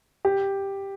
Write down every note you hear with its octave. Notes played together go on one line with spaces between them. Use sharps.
G4